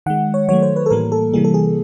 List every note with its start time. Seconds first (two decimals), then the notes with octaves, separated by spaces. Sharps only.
0.06 D#3 G#3 F#5
0.34 C#5
0.48 D#3 F#3 A3 C#5
0.62 C5
0.76 B4
0.86 A4
0.90 A2 E3 G3 A#3 A#4
1.12 A4
1.33 C3 E3 G3 A#3 G#4
1.44 A4
1.54 G#4